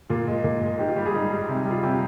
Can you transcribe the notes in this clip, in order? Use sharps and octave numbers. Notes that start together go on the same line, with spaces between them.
A#2 F4
G#3
A#2
G#3
G#2 G4
F4
G3 G4
G#4
G#2
G3
C3
G3
F4
C3 G4